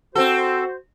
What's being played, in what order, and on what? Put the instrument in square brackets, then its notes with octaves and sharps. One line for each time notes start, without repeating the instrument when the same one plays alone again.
[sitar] C4 A4 [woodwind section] F#4 C5